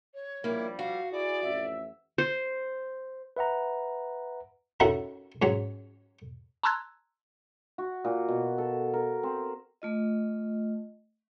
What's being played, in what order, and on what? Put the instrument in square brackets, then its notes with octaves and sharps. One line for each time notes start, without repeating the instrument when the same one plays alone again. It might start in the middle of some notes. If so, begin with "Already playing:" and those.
[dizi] C#5
[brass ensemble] A#1 F3 G3 [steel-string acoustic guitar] A#3 E4
[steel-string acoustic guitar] F#4 [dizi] F5
[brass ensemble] E4 G#4 [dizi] D5
[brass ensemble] A1 F2 E5
[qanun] C5
[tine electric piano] B4 E5 F#5 A#5
[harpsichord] C#4 D#4 E4 F#4 A4 A#4
G#2 F#3 C#4
[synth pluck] A5 A#5 C6 E6 F#6 G#6
[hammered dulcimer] F#4
A#2
B2
A4
A#4
C4
[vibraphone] A3 F4 D#5